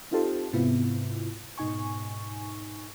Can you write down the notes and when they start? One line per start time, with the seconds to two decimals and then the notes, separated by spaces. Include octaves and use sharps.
0.11 C4 D#4 F4 G4 A4 C5
0.53 G#2 C3 B3 E4 F4
1.58 G#2 B2 D#4 G#5 C#6